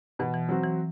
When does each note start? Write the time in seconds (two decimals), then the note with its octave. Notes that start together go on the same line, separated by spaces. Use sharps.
0.19 B2 E3
0.34 E3
0.49 F#3 C4 F#4
0.64 E3